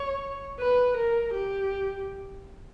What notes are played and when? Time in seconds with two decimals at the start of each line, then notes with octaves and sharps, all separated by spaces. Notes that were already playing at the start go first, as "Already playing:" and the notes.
Already playing: C#5
0.60 B4
0.97 A#4
1.34 G4